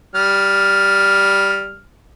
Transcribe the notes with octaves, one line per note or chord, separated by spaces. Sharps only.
G3 F6